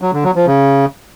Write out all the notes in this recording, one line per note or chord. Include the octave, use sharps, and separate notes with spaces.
F#3
D3
F#3
F3
C#3